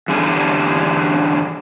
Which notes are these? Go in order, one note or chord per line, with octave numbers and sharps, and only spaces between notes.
E2 G2 D3 G3 G#4